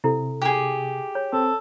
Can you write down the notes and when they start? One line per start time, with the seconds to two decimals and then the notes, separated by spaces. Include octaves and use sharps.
0.04 C3 E4 A4
0.42 G4 G#4
1.15 C#5
1.33 C4 A4